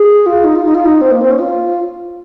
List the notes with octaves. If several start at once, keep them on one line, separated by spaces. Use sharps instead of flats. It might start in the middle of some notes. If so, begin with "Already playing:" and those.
Already playing: G#4
F4
D#4
F4
D#4
F4
D#4
C4
A#3
C4
C#4
F4